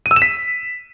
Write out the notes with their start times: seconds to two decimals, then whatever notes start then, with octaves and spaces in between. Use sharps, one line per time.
0.06 D#7
0.11 E6
0.16 E7
0.22 B6